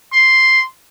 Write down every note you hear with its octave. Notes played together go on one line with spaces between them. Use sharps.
C6